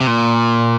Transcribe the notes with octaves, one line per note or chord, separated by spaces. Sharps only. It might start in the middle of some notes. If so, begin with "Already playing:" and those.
C3
A#2